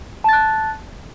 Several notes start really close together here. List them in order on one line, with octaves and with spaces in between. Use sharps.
A5 A6 F#6